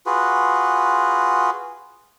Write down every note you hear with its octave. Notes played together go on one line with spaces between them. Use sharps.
F4 F#4 G#4 B4